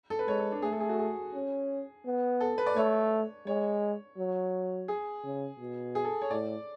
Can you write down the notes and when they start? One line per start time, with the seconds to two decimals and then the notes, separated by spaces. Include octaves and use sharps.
0.10 A4
0.19 B4
0.28 G#3 C#5
0.39 A4
0.52 D4
0.62 A3 G#4
0.72 A4
0.80 G#4
0.89 F#4
0.99 G#4
1.34 C#4
2.06 B3
2.40 A4
2.58 B4
2.66 D5
2.76 A3 C#5
3.46 G#3 C#5
4.17 F#3
4.88 G#4
5.24 C#3
5.60 B2
5.95 G#4
6.05 A4
6.22 C#5
6.31 A2 D5